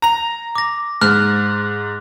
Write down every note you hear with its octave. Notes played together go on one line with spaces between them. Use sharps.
A#5 F7
D6 A#6
G#2 F6 F#6